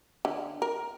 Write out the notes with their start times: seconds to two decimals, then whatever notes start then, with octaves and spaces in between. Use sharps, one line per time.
0.25 D3
0.62 A#4